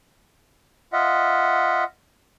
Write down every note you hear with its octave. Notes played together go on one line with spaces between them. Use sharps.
F4 D#5 E5 F#5